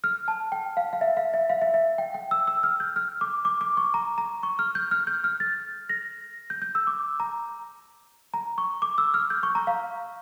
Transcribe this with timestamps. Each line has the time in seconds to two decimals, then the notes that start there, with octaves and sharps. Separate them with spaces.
0.04 F6
0.28 A5
0.52 G5
0.77 F5
0.93 F5
1.01 E5
1.17 F5
1.34 E5
1.50 F5
1.61 E5
1.74 E5
1.98 G5
2.14 G5
2.31 E6
2.47 E6
2.63 F6
2.80 G6
2.96 F6
3.21 D6
3.45 D6
3.61 D6
3.77 C#6
3.94 A#5
4.18 A#5
4.43 C#6
4.59 F6
4.75 G6
4.91 F6
5.07 G6
5.24 F6
5.40 A6
5.89 A#6
6.50 G6
6.62 G6
6.75 E6
6.87 D6
7.20 A#5
8.34 A#5
8.58 C#6
8.82 D6
8.98 E6
9.14 F6
9.30 G6
9.43 C#6
9.55 A#5
9.67 F5